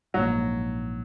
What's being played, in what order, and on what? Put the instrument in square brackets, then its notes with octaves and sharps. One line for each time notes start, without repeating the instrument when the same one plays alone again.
[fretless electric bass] A#1 G#2 F3 A#3 [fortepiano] F#3